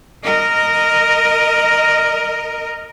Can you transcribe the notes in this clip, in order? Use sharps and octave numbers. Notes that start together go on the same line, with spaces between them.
A#4 D#5